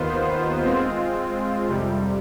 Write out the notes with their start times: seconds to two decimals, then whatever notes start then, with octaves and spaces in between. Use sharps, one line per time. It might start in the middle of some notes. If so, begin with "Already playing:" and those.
Already playing: D#2 D#3 B3 F4 C5
0.64 G#3 C4 F4
1.68 F2 C3 G3